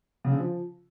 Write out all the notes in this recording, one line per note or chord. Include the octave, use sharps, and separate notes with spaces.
C#3
D3
F3